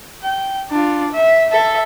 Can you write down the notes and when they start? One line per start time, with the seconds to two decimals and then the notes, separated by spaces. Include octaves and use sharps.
0.22 G5
0.71 D4 F4
1.12 E5
1.50 A4 E5